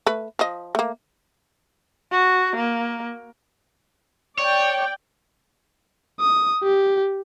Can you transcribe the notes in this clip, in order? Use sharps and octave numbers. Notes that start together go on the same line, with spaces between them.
A3 B4
F3 D#5
A3 A#3
F#4
A#3
C#5 D5 G5
D#6
G4